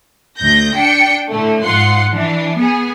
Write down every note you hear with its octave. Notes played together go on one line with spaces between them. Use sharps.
D2 G6 A#6
D4 G5 C#7
A2 D3 A3
G#2 F4 F#5 C6
E3 D4
B3 G#4